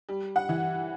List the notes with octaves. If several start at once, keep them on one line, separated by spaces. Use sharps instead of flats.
G3
F#5
E3